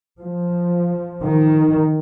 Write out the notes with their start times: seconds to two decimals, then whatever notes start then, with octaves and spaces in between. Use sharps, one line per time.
0.21 F3
1.22 D#3